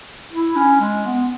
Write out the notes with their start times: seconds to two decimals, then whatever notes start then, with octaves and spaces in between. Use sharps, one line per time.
0.33 E4
0.56 C#4
0.81 G#3
1.06 B3